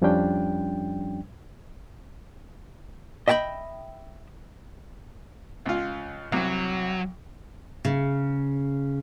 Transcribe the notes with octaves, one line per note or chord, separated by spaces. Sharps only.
F2 F3 G3 C#4 D4 G5
D#5 E5 G5 A5 B5
C#2 F4
C2 F#3
C#3